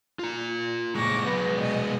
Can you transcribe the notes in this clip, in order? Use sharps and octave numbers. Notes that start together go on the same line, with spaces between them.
F4 A#5
A#2 G#3 C#6 D6 A#6
F#3 G#3 B3 B4
B2 D#5